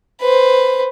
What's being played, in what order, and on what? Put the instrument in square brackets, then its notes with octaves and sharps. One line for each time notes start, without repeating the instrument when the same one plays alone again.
[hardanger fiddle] B4 C5